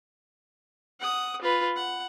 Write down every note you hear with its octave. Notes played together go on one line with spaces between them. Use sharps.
F#5 D#6
F4 B4
F#5